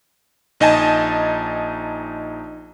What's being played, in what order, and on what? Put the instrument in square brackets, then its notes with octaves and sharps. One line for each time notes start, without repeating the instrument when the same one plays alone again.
[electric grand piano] A#1 D#4 D#5 G#5 A5